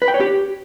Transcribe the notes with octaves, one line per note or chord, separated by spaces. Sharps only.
B4
G5
C#5
G4